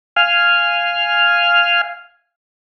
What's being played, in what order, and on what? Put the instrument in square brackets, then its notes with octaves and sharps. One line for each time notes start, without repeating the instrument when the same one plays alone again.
[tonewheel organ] F5 G#5 F6